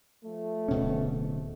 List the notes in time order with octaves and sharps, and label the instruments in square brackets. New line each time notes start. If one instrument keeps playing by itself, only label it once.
[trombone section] F3 A3
[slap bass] D1 B2 C#4